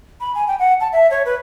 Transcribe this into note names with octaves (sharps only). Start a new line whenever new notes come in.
B5
G#5
G5
F#5
A5
E5
C#5
B4